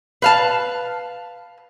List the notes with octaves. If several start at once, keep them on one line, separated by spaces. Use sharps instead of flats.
B4 F5 A5